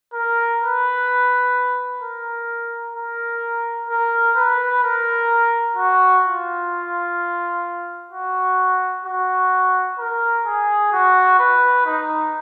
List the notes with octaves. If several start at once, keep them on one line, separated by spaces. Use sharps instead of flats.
A#4
B4
A#4
A#4
A#4
B4
A#4
F#4
F4
F#4
F#4
A#4
G#4
F#4
B4
D#4